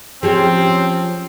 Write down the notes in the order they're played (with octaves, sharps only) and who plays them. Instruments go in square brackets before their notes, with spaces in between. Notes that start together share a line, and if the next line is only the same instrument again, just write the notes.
[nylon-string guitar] F3 [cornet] C4 [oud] C#4 G4 G#4